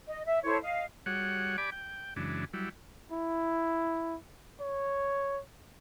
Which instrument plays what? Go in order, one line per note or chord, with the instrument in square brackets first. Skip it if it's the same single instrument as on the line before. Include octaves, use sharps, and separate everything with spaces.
[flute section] D#5
E5
E4 A4 C5 C#5
D#5 F5
[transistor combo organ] G3 F#4 G#4 C#5 F#5
G4 D5 G#5 B5 D6
G5
F#2 C#3 E3 G#3 D4
F#3 G3 E4
[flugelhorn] E4
C#5